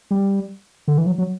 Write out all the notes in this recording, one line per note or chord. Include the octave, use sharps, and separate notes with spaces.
G3
D3
E3
F#3
F#3